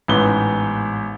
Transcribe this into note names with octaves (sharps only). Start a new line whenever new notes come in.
A1 G#2 B3 G7